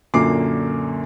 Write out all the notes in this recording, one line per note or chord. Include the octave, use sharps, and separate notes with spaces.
F#2 A#2 D3 A#3 D6 C7